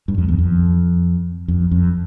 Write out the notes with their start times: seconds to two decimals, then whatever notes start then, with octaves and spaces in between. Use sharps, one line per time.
0.08 G2
0.18 F2
0.28 E2
0.39 F2
1.48 F2
1.71 F2